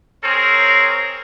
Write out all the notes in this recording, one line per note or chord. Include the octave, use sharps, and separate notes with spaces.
C4 G#4 A#4 C#5